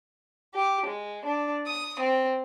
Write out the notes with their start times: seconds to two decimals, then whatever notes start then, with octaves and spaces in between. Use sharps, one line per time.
0.53 G4
0.85 G#3
1.24 D4
1.66 D#6
1.99 C4